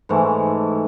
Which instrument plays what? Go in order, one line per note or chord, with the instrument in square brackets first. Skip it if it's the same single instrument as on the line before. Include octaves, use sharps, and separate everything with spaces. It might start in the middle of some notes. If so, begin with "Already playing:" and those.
[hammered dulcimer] G#2 E3 A3